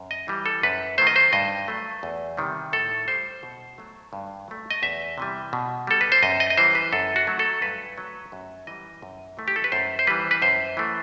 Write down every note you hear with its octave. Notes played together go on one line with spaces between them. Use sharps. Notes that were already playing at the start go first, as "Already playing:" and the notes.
Already playing: F#2
D#5
E3 G3
A4
F#2 B4
D#3 F#3 A3 C5
D#5
C5
G2 D#5
F#3 A3
E2
C3 D#3 G3
A2 A4
G3 C5
B2
F#3 A3
G2
F#3 A3
D#5
E2 E5
C3 E3 G3
B2
G3 A4
B4
C5
F#2 D#5
D#5
D#5
E3 G3 C5
B4
F#2 A4
F#4
F#3 A3
A4
G2 B4
F#3 A3
F#2
E3 G3 D#5
F#2
E3 A3
G4
A4
B4
F#2 C5
C5
E3 G3 B4
B4
F#2 C5
E3 A3